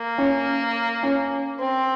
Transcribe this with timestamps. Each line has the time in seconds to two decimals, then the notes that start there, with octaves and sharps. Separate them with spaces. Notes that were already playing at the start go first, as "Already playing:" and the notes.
Already playing: A#3
0.18 C#4
1.03 C#4
1.59 C4